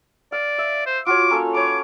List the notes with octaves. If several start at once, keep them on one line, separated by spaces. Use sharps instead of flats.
D5 F5
E5
C5
F4 F#4 C#5 D6
A#3 C#4 A4
B4 C#5 D6